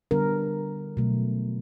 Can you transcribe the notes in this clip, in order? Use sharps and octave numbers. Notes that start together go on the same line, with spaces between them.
D3 G3 B3 D4 A#4
B2 F#3 A3